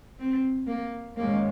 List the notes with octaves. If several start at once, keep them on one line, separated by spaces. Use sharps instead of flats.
C4
A#3
G#2 D#3 G#3 A#3 C#4